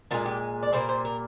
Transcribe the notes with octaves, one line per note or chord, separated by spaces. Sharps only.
A#2 F3 G#3 F4
G4
D5
A#2 G3 A#3 C5
C5
A#4